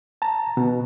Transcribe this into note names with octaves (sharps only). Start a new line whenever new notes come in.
A5 A#5
B2